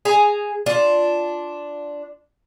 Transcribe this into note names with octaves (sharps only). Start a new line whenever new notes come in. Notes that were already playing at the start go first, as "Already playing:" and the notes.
G#4 G#5 A#5
D4 F4